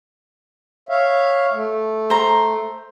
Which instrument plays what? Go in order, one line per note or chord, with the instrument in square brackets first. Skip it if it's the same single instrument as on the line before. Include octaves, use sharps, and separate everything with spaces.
[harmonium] C#5 E5 F5
A3
[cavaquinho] C5 A#5